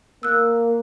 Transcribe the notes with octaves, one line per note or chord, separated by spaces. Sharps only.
A#3 E6 F#6